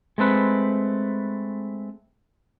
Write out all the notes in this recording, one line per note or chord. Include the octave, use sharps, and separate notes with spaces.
G#3 A3 C4 B4